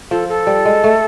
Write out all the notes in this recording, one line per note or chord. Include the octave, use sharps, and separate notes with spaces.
F3 A4
A4
G3
G#3
A3